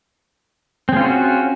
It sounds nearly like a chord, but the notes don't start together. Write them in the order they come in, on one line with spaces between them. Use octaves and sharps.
C4 G#4 F4 C#4 F#4